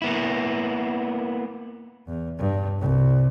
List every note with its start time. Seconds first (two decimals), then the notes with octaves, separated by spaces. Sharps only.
0.02 A#3 B3 E4
2.08 E2
2.39 G2
2.81 C2